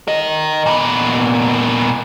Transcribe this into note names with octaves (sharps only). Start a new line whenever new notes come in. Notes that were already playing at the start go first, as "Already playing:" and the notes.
A#4 D#5
A#2 B3